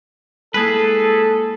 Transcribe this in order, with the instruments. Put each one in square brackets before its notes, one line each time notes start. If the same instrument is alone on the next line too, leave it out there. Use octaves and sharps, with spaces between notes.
[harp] G#3 A#3 E4 [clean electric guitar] G#4 B4 [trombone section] A4